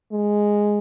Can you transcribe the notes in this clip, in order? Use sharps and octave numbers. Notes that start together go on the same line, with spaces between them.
G#3